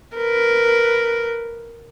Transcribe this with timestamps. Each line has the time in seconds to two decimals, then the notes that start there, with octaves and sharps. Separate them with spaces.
0.16 A#4 B4